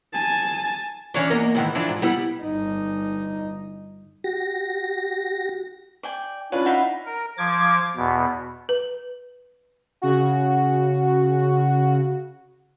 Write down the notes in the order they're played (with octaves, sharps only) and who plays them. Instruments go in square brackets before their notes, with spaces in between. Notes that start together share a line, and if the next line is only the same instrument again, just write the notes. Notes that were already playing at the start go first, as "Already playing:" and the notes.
[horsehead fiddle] G#5 A5
[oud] E3 C#4 D4
E2 A#3 D#5
G#2 D#3 E3
E3 F3 D4
G#2
G3 B3 E4
[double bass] G1 D#4
[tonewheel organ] F#4 G4 A#6
[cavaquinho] D5 G5 G#5
[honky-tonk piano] C#4 F4 [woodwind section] D4 E4 [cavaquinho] B4
[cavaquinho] D#4 E5 B5 [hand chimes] F#5
[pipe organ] A#4
F3 D6 G#6
E2 B2
[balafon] B4
[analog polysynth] C#3 F#4